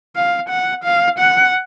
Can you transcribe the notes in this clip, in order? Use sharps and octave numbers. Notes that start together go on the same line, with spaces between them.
F5
F#5
F5
F#5